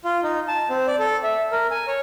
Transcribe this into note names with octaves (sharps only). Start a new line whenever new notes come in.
F4
D#4
A5
C4
D5
A4
E5
A#4
G#5
C#5